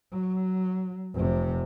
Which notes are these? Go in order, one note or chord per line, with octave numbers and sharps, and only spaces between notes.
F#3
F1 C3